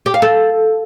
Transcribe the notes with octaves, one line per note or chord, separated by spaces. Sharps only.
G4
F5
A4